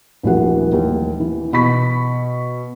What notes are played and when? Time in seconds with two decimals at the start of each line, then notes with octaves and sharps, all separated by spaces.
0.23 D#1 A#1 E3 A3 F#4 F#5
0.72 D#2
1.20 E3
1.53 B2 B5 C#6 B6